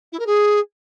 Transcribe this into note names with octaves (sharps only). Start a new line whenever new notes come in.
E4
A#4
G#4